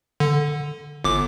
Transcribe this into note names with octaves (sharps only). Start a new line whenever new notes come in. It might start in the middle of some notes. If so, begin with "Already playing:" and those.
D3
G1 D6